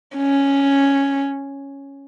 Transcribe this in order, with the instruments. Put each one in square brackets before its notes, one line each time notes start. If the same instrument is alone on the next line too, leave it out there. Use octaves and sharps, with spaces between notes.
[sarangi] C#4